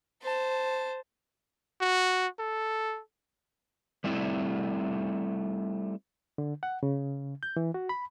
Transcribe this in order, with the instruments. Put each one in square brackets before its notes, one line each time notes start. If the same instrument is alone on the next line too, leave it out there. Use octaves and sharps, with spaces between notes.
[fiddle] C5 A5
[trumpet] F#4
A4
[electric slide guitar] G3 A3 C4 E4
[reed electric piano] D3
F#5
C#3
G6
E3
F#4
B5